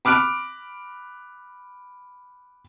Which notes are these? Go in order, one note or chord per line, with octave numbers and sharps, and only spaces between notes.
B5 D6 F6 F#6 D7